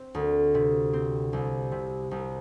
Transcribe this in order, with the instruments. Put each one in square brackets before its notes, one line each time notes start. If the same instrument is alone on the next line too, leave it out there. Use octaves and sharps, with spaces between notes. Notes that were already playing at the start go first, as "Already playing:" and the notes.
Already playing: [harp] C4
D2
C3
C4
C2
C3
C2